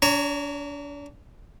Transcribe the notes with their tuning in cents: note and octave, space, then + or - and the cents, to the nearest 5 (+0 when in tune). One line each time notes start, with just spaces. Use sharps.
D4 -40 C#5 +10 A#5 -20